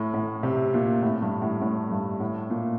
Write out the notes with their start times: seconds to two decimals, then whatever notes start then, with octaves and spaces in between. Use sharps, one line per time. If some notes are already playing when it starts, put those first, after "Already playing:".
Already playing: A2
0.14 A2
0.43 C3
0.74 A#2
1.03 A2
1.22 G2
1.42 A2
1.62 A2
1.91 G2
2.20 A2
2.50 A#2